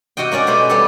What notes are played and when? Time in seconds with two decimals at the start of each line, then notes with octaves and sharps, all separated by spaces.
0.17 C3 F#4 D#5 G5
0.31 A#3 C#4 D5 D#5
0.47 B2 A3 G4 C5 B5
0.69 G3 B3 C4 G4 A4